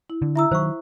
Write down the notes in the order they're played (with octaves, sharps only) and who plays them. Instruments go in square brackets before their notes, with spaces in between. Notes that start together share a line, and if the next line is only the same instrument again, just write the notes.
[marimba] E4
[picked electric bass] D3
[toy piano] E4 D#6 [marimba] E5 A#5 E6
[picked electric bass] D#3 F#3 [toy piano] C5 F5 C#6